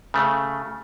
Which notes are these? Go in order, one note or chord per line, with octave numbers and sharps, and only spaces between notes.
C#3 A3